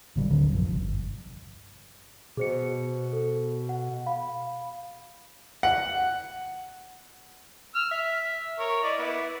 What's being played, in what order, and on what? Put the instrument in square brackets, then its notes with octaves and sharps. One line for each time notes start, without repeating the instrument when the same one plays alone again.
[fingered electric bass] G#1 C#3 G3
D1 D2 D3 F#3
A#1 F#2 C3 F3
G1
[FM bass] B2 [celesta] G#4 C5 C#7
[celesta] A4
F#5
F5 B5
[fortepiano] F#5
[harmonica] E6 F6
E5
A#4 C#5
E4 D5 D#5
B3 E4